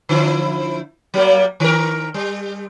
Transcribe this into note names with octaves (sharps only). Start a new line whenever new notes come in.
D3 F3 E4
F#3 G3 A#3
D#3 A#4
G3